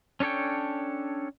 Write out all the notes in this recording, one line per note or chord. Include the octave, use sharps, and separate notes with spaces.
C#4 D4 A4 C#5 G5